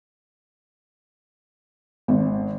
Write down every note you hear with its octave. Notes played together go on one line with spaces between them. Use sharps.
G#1